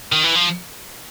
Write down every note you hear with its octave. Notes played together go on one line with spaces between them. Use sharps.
D#3
E3
F3